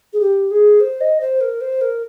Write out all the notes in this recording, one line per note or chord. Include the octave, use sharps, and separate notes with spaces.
G#4
G4
G#4
C5
D#5
C5
A#4
C5
A#4